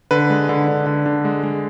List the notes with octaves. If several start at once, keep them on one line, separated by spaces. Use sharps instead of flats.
D3 B4
G#3
D3
D3
D3
D3
G#3
G#3